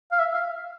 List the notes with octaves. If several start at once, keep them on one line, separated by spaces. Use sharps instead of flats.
F5
E5
F5